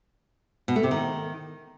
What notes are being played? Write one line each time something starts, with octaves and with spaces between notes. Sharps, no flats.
B2
A3
C3
D#3